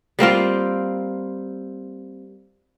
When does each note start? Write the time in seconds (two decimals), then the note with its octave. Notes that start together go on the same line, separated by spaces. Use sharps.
0.19 G3 A#3 C4 F4